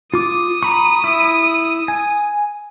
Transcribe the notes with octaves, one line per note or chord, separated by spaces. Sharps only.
F4 D6 D#6
A#5 B5 C#6
E4
G#5